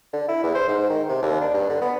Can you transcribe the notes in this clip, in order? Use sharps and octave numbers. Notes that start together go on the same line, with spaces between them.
D3
E4
E2
C5
G#2
D#3
C3
D#2
D4
G2
D3
B3